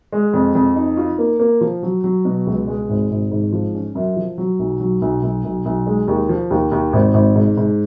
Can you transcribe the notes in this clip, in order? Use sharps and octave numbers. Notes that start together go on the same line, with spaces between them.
G#3
F2
F2
D#4
F4
A#3
A#3
F3
F#3
F#3
B2
C#2
G#3
G#1
G#1
G#2
F3
C#4
F#2
F3
F#3
B1
F#3
B1
B1
B1
B1
G#3
D#2
F3
D#2
D#2
G#1
G#1
G#2
G#2